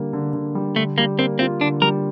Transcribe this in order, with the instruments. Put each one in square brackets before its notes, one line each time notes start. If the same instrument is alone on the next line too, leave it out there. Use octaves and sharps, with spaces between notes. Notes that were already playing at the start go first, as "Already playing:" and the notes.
Already playing: [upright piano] D3 G3 A#3
D3
D3
G3
[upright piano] D3 [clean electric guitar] A3
[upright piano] G3 [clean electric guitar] A#3
[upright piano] A#3 [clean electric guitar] C4
[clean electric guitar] C4 [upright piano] F4
[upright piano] D3 [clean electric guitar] D4
[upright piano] G3 [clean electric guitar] A#4